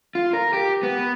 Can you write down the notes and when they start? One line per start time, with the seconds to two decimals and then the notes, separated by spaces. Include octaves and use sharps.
0.15 F4
0.33 A#4
0.53 G4
0.83 B3